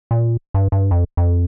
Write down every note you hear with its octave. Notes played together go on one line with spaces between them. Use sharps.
A#2
G2
G2
F2
F2